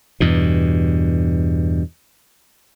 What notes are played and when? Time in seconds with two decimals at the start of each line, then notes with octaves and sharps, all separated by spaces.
0.20 E2 G2 B2